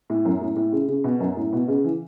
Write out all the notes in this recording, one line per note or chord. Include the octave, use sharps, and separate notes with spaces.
A2
F#2
A2
A2
C#3
C#3
B2
F#2
A2
B2
C#3
E3